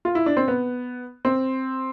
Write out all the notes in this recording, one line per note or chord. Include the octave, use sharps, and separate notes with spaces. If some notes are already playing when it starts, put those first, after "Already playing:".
F4
E4
D4
C4
B3
C4